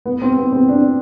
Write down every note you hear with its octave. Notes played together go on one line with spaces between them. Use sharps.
B3
C4
B3
C4
D4